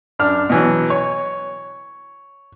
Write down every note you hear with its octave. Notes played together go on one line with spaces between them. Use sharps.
F#2 D4 F6
B2 E3 F#3
C#5